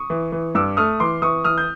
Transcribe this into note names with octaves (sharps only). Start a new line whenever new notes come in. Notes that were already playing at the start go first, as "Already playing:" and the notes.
Already playing: C#6 D#6
E3
E3
G2 D6 E6
A3 D#6 F6
E3 C6 D6
E3 C#6 D#6
E3 D#6 F6
G6